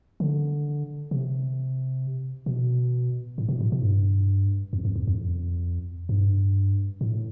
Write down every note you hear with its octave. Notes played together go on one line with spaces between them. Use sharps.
D3
C3
B2
A2
B2
A2
B2
G2
F2
F2
E2
F2
G2
A2